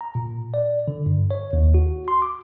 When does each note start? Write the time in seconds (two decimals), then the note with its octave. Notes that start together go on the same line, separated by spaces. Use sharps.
0.01 A#5
0.15 A#2
0.54 D5
0.88 D3
1.06 G2
1.31 C#5
1.53 D#2
1.74 F#4
2.08 C6
2.22 D6